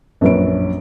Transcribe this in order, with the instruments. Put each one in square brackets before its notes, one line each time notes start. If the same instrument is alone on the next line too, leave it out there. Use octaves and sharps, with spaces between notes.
[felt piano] A#1 F#2 B4 C#5 D7